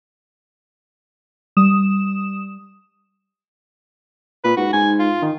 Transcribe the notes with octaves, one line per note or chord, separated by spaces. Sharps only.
G3 D#6 E7
A#2 B4
G#2 F#4
G#2 G#5
F4
D#3